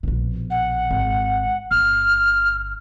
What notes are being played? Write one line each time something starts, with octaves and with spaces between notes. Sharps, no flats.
A#1 B2
F#5
G#1
G1 F6